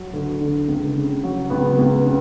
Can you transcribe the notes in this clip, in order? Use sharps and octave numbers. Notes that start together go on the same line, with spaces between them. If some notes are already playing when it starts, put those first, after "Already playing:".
Already playing: F#3
D2
D3
C#2
C#3
F#3
C#2 B3
C#2
C#3